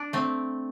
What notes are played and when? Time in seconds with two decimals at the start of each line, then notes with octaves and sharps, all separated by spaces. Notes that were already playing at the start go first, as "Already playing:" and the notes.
Already playing: D4
0.13 A3 C4